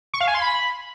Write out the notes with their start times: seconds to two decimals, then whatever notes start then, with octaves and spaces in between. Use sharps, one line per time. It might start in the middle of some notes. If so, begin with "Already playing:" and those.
0.14 C#6
0.21 F5
0.28 G#5
0.34 C6
0.41 B5